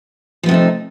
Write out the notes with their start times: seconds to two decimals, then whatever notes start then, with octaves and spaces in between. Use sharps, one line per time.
0.43 F3
0.46 B3
0.49 C3
0.51 A3
0.54 D#4